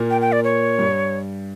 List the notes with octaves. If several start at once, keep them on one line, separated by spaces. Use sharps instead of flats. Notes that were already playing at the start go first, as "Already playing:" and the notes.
Already playing: A#2 A#3
G5
G5
D5
C#5
G2 G3